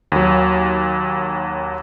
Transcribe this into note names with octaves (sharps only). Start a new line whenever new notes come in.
D#2 F#3